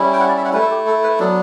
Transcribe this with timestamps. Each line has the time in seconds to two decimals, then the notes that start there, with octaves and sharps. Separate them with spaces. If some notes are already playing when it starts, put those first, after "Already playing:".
Already playing: G3 C#4 E4
0.13 G5
0.20 F#5
0.28 D5
0.37 E5
0.45 F#5
0.53 A3 E4 B4
0.61 A4
0.71 G4
0.87 A4
1.04 B4
1.19 F#3 B3 D4 A4